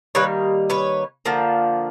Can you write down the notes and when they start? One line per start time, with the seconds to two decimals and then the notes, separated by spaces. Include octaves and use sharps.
0.15 D#3 G3 A#3 B4 C#5
0.70 B4 C#5
1.26 D3 F3 A#3